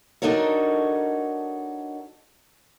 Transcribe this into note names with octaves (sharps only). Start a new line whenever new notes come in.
D4 D#4 F#4 A4 A#4 C#5